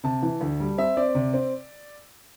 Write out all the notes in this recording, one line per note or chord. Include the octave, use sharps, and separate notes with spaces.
C3 A5
E3
D2
G3
C4 E5
C4 D5
C3
C4